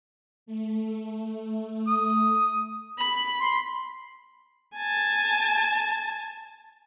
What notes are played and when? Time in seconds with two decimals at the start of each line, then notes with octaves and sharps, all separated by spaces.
0.46 A3
1.87 D#6
2.99 B5 F#7
3.40 C6
4.76 G#5 A5